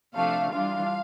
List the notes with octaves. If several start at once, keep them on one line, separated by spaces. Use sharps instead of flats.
C3 F3 A3 D4 F5
E3 G3 D4 F4 F5